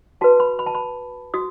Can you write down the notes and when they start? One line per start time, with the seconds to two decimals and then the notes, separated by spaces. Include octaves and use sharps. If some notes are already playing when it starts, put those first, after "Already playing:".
0.21 F#4 B4 A5
0.40 B5
0.59 B5
0.66 A5
0.75 B5
1.34 F#4 D#6